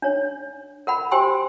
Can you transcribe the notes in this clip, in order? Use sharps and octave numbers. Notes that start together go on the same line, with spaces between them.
D4 C#5
A#4 F#5 B5
G4 C5 G5 G#5 C6 E6